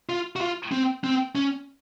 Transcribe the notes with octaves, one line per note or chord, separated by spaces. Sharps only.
F4
F#4
F4
C4
C4
C#4